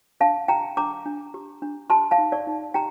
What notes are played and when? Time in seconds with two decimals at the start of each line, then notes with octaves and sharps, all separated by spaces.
0.20 D4 F5 A5
0.48 G4 G5 A#5
0.77 D4 A#5 D6
1.05 D4
1.34 G4
1.62 D4
1.90 G4 A5 C6
2.11 F5 A5
2.18 D#4
2.32 D5
2.47 D#4
2.74 G4 G5 A#5